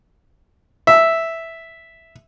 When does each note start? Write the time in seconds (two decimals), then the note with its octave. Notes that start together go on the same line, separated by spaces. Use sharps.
0.87 E5